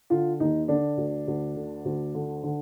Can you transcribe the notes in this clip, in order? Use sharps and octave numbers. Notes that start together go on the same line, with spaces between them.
D3 F4
D#2 D#4
D3 D4
D2
D2
D3
D2
D3
D3